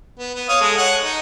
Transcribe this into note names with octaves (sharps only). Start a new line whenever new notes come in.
B3
B3
C#5 F5 D#6
G#3 A4
C#5 F#5
D#4